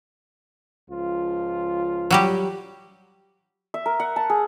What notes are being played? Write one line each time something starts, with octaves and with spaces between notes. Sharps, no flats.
C#2 F3 F4
F#3 G3 G4
E5
A#4
F#5
A5
G#4